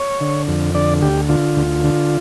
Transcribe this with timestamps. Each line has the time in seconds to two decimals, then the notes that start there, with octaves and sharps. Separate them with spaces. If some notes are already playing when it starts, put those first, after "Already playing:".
Already playing: C#5
0.21 D3
0.48 F2
0.75 D3 D5
1.02 D2 G4
1.29 D3 F4
1.57 D2
1.84 D3